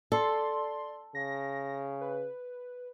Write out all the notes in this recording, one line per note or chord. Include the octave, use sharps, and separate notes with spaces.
A4 D5 C6
C#3 A#6
B4